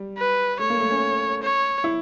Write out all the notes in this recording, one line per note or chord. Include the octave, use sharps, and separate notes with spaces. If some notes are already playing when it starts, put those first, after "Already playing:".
Already playing: G3
B4
A3 C#5
A#3
A3
C#4
C#5
E4